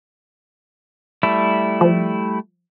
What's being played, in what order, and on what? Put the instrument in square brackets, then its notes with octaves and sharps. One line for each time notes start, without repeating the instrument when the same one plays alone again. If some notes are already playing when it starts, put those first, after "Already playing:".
[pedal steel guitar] G3 A3 E4
[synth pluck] F3